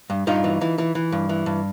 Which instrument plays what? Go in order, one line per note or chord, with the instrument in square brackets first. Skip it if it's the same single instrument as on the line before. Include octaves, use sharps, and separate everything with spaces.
[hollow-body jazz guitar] G2
G2 D#4 F4
E3
E3
E3
E3
G2
E3
G2